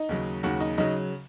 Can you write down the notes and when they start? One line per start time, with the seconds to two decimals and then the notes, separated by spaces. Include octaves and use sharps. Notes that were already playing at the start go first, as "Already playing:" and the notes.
Already playing: D#4 D#5
0.09 D#2 C#3 F#3
0.43 D#2 C#3 F#3 F#4 F#5
0.60 D#4 D#5
0.78 C#3 F#3 D#4 D#5